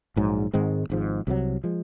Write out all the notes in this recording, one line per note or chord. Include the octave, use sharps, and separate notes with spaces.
A#1 G#2 F#3
G#2 D#3 G#3 C4
G#1 G#2 F3
C2 C3 D#3 F#3
F3 G#3